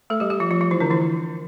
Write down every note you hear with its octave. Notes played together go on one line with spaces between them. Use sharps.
A3 A4
G3 G4
G3 G4
F3 F4
F3 F4
F3 F4
E3 E4
D3 D4
E3 E4